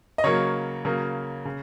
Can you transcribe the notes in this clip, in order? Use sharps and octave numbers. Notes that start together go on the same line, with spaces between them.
D#5
C#3 F#3 A#3 C#5
C#3 F#3 A#3
C#3